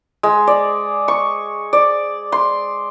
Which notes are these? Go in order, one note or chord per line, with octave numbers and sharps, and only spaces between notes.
G#3
D5
C#6
D5
C6